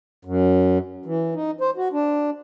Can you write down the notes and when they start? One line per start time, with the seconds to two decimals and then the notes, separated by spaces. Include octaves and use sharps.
0.25 F#2
1.06 E3
1.34 D#4
1.61 C5
1.77 F#4
1.93 D4